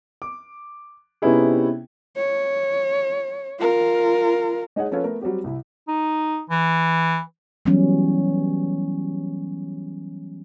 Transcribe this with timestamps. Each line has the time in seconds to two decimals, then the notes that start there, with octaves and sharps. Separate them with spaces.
0.22 D6
1.22 C3 B3 C#4 D#4 E4 G#4
2.17 C#5
3.60 F4 A#4
4.76 G#3 D#4 G#4 C#5 F#5
4.91 F3 C#4 F4 A4 B4 C#5
5.04 A3 B3 A#4
5.21 F#3 G3 C4 F#4 G4
5.44 C2 E4
5.88 D#4
6.50 E3
7.66 E3 F#3 G3 B3 C#4